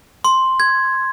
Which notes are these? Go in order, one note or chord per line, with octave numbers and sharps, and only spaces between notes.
C6
G#6